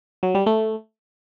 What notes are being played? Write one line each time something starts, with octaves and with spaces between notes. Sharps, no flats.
F#3
G3
A3